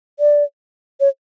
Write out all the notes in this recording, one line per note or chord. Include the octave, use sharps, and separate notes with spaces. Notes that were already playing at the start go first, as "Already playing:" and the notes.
D5
C#5